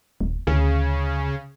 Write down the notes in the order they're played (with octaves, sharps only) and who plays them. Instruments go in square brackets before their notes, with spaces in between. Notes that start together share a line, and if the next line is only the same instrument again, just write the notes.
[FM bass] D#1
[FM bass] D2 [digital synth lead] C#3